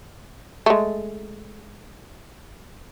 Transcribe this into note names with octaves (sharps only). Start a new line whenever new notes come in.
G#3 A3